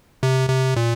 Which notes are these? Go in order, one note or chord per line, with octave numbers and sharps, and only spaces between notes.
C3
C3
A#2